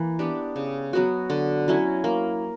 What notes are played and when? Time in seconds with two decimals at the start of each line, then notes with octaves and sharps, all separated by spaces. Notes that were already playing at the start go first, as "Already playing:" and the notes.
Already playing: E3 A#3 E4
0.19 B3 D4 G4
0.56 C#3
0.93 F#3 B3 F#4
1.30 D3
1.68 F#3 C#4 E4
2.04 A#3